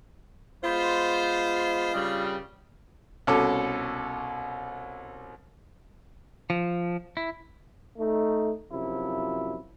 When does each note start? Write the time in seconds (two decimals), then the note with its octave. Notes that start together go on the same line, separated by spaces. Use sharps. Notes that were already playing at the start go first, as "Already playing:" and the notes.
0.64 G#3 B3 F4 C5
1.94 G2 C#3 G3
3.27 C2 B2 C#4 A4 D6
6.50 F3
7.17 E4
7.98 A3 D#4
8.71 F#2 C3 F3 E4